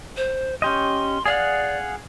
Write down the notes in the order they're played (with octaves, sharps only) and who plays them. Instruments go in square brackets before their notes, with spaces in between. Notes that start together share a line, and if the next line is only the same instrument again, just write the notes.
[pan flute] C5
[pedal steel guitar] C#4 G4 D#5 [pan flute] C6
[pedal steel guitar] G#4 F5 F#5 [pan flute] D5